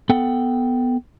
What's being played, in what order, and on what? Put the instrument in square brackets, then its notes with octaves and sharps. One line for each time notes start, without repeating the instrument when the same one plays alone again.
[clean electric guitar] B3 A4 F#5 G5